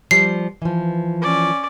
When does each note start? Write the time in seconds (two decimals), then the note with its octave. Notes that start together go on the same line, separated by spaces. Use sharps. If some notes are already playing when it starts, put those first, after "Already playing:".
0.11 F3 G3 C7
0.62 E3 F3
1.22 C#4 D5